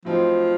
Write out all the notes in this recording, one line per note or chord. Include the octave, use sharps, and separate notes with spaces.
A2 F3 F#3 C4 D#4